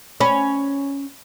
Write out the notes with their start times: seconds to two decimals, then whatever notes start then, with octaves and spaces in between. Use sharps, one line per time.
0.20 C#4 B5